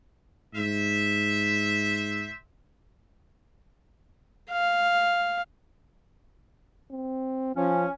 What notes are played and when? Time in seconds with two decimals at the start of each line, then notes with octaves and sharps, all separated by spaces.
0.55 G#2 C5 E5
4.51 F5
6.91 C4
7.56 F3 C#4